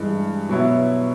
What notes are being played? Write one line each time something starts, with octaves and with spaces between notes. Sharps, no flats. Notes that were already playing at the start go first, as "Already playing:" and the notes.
Already playing: G2 E3 G#3
B2 F#3 B3 E4